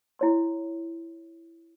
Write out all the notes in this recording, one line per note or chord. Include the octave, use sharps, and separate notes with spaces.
E4 C#5 C6